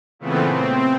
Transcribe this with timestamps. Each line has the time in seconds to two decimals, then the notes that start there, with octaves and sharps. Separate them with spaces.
0.19 A#2 C#3 E3 A3 B3 C4
0.50 C4